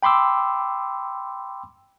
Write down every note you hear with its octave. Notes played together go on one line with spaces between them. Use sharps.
G5 B5 C6 D6 E6